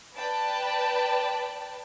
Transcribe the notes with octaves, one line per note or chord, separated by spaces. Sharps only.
B4 D5 G5 A5